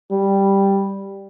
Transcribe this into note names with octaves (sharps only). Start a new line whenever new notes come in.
G3